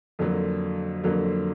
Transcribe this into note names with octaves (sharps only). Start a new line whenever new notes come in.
F2 D3 F#3 A#3
F2 D3 F#3 A#3